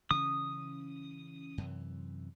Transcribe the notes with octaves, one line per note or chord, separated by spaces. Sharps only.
C#3 E3 C#4 D#6
F#2 C3 E3